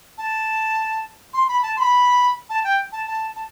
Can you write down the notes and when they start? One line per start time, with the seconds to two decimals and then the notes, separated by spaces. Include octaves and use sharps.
0.18 A5
1.33 C6
1.48 B5
1.63 A5
1.76 C6
1.80 B5
2.49 A5
2.64 G5
2.92 A5
3.07 A5
3.36 A5